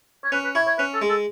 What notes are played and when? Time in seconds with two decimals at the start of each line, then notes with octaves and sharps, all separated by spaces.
0.24 C#5
0.32 C#4 B4
0.44 B4
0.55 E4 C#5
0.67 C#5
0.79 C#4 B4
0.94 A4
1.02 G#3
1.10 A4